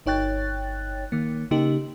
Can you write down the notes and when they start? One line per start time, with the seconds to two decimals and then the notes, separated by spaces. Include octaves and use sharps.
0.06 G1 D#4 C#5 G5 F#6 A6
1.12 D#3 A#3
1.51 C#3 A#3 D#4 G4